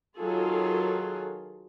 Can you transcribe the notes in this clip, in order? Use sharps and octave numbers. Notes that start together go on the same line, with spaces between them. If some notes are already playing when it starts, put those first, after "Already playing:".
D#3 F#3 F4 G#4 A4